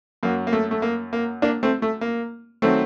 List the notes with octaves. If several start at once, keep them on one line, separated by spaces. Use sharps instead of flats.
F#2 F#3 A#3
A#3
A3
A3
A#3
A#3
A#3 D4
A3 C4
A3
A#3
D#3 F#3 A3 C4